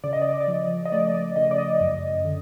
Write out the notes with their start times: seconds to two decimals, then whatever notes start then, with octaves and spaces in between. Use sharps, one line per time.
0.04 C#3 D5
0.13 D#5
0.22 D5
0.31 D#5
0.40 D5
0.48 F3
0.85 D#5
0.92 A3 D5
1.14 D5
1.36 C#3 D#5
1.51 D5
1.58 D#5
1.80 F#2
2.25 D3